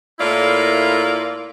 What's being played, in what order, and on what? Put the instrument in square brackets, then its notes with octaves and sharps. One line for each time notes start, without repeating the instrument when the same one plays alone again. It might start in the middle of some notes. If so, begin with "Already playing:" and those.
[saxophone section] A2 A#3 E4 F4 A#4 D5